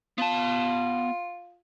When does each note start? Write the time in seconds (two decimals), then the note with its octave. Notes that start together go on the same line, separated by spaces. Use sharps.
0.18 B3 F4 A5